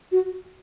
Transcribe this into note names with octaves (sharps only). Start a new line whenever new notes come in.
F#4